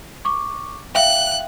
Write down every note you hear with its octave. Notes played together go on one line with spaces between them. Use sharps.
C#6 D6
E5 F5 G5 F#6